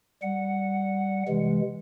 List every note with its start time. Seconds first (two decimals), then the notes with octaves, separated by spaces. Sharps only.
0.23 G3 F#5
1.28 C3 E3 G#3